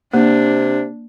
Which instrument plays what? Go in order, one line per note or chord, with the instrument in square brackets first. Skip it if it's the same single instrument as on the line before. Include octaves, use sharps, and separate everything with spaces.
[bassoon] C3 [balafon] A#3 [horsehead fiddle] D4